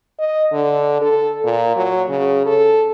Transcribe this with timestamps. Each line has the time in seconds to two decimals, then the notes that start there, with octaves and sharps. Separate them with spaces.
0.19 D#5
0.52 D3
1.01 A4
1.44 A#2
1.76 F#3
2.09 C#3
2.46 A4